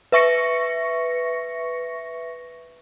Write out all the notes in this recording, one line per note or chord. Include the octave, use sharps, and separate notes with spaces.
B4 E5 C#6 A#6 C#7